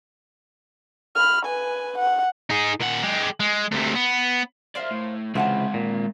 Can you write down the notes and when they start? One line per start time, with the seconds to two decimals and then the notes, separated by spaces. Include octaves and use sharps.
1.15 B5 F6
1.45 B4 G#5
1.98 F#5
2.50 D#4 G#4
2.81 A#2 F#5
3.03 G#3 G4
3.40 G#3
3.72 D2 C3
3.95 B3
4.75 A#4 C5 D5 E5 F5
4.91 A2
5.35 C#2 C3 E3 G#3 C4 F4 F#5 A5
5.74 A#2